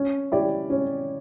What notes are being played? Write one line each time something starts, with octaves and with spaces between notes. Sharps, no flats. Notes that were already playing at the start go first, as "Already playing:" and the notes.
Already playing: C#4
E4 G4 D5
C#4